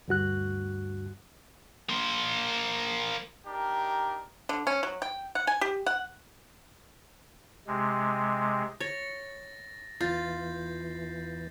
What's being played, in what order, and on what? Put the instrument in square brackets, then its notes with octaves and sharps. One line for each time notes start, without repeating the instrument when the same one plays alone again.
[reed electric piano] D2 G2 F#4 F#6
[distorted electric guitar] A#3 C5
[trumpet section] D4 D#4 G4 A#4
[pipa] D3
C#4
F#3
G5
F#5
G#5
G4
F#5
[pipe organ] C3 G#3
[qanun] C#5 [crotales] A6 A#6
[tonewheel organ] E2 E3 [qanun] F4 [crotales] G6 A6 C7